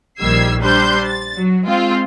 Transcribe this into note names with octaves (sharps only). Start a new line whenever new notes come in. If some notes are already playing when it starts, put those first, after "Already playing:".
A#1 D#3 G3 E6 G#6 C7
G3 D4 C5 C6 G6
A6
F#3
G#3 C4 F4